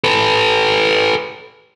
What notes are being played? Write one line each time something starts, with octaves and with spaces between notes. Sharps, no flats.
A4 B4